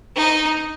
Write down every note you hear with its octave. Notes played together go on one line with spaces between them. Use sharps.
D#4